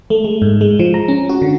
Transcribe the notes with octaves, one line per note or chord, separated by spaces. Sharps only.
A3
G#3
G#2
G#3
F3
A#5
C#4
F#4
D3